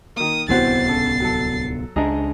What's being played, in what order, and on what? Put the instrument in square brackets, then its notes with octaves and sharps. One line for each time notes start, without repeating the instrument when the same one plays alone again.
[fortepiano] D#3 A#3 [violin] D#6
[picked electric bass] D1 C2 B3 [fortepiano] E3 C4 F#4 [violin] A6 C7
[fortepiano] C#3 A4
F#3 A4
[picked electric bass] C#2 D4 [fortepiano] G#4 D#5 A#5